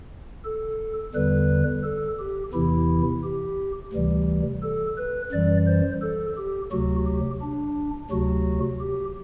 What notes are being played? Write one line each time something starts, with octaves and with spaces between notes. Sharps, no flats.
A4
E2 D3 G3 B4
A4
G4
E2 C3 E3 E4
G4
D2 C3 E3 G3
A4
B4
F#2 E3 G3 D5
C5
A4
G4
D2 C3 F#3 F#4
G4
D4
D2 C3 F#3 F#4
G4